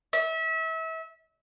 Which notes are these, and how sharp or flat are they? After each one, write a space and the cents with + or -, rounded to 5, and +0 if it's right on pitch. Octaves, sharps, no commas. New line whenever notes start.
E5 -30